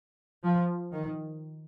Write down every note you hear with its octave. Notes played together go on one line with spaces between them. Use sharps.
F3
D#3